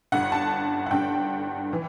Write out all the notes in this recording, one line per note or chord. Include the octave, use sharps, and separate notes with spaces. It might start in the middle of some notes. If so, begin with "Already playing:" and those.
G1 G2 D3 F#5
A5
F#5
G1 G2 D3 G5
E3